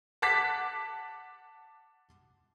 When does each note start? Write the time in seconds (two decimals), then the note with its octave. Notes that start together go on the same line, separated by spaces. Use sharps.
0.22 F#5 A5 D6 F#6 B6